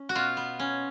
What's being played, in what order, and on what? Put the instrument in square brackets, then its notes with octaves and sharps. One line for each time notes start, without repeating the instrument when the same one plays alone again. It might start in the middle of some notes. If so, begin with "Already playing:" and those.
Already playing: [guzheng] C#4
F#4
B2 F4
B3
C#4